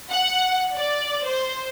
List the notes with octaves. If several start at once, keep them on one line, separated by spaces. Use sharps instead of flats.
F#5
D5
C5